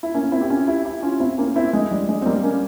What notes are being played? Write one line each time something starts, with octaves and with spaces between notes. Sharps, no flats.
E4
A#3 C#4
C4 E4
G4
C#4 F4
E4 G4
E4 G4
C#4 F4
C4 E4
A#3 C#4
C4 E4
G#3
G3
G#3
C4
G3 A#3
A#3 C#4